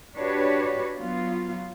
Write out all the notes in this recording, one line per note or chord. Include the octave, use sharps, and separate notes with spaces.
D4 F#4 G4 B4 C#5
F#3 B3 F4